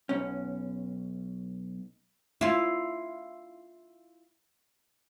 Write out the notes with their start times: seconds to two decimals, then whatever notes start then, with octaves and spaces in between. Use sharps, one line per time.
0.09 B1 C#4
2.41 E4 F4